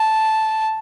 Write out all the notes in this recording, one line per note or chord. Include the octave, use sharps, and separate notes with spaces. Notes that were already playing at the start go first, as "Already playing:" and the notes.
Already playing: A5